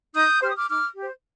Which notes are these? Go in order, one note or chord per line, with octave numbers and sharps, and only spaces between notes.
D#4 D#6 G6
G4 C5 F6
D#6
D6 F6
D#4 D6 F6
G4 C5